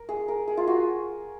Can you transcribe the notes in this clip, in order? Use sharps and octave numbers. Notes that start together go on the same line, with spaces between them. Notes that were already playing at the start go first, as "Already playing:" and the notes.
Already playing: A#4
G#4
A#4
G#4
F4
F#4